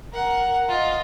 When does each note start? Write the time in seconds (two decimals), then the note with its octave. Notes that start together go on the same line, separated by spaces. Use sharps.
0.12 A#4 F#5
0.68 F4 D#5